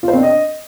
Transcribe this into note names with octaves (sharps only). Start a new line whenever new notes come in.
F4
C5
C4
D4
D#5